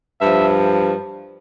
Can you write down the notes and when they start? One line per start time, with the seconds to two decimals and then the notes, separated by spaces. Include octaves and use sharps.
0.20 G2 F3 E5